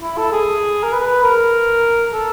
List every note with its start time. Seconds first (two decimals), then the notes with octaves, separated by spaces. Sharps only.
0.02 E4
0.17 A4
0.32 G#4
0.83 A#4
0.93 B4
1.23 A#4
2.13 A4